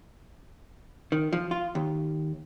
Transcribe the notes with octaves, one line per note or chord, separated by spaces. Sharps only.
D#3
F3
F4
D#2